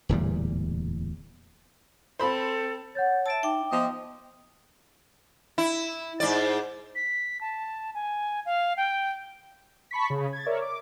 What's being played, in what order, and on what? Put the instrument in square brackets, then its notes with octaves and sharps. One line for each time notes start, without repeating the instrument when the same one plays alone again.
[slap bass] D1 E2 A#2 G3
[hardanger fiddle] C4 [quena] A4 [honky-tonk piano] C5 B5
[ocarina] C#5 [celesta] F#5 G6 A6
[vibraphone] E5 A5 [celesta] E6 A6 D7
[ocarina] D#4 [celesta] E5 D6 [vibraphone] G5
[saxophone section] F3 D#5 [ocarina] B3
[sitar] E4
G#2 D5
[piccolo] B6
A5
G#5
F5
G5
[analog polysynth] A5 B5 C#6 B6
C#3
G#6 A6
A#4 C#5 D5 E5
D6